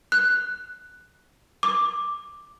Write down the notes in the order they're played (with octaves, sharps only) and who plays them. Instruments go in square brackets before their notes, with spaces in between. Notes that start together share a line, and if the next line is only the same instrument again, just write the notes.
[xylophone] F#6
D6